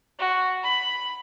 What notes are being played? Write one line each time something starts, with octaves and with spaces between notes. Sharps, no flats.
F#4
B5